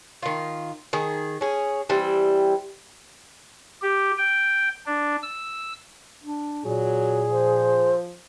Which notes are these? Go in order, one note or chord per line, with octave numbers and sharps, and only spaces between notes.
D#3 F4
D#3 G#4
C#4 G#4
E3 G3 C4
G4
G5
D4
E6
D4
A#2 F#3 G#4
F3 C5